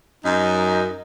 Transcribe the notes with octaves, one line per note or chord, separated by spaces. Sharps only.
F#2 D#4